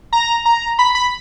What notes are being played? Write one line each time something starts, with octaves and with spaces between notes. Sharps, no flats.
A#5
A#5
B5
B5